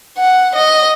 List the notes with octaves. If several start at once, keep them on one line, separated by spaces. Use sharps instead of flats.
F#5
D#5